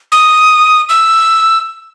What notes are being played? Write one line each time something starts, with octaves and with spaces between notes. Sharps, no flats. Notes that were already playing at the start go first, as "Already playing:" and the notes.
D#6
E6